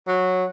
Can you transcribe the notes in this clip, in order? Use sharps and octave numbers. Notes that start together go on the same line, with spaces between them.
F#3